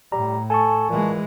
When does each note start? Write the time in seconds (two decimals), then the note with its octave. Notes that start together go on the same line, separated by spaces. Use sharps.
0.12 A2 G3 A#5
0.50 A4 G#5 A5 C#6
0.89 A#2 E3 G#3